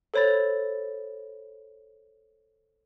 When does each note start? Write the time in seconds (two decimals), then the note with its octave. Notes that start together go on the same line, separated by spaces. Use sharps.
0.14 A4 C5 C#5 B5 A6